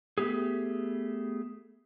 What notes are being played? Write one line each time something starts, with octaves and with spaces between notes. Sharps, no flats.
A3 B3 G4 G#4